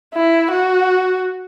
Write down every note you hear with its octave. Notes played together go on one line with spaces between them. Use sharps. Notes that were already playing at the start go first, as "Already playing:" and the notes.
E4
F#4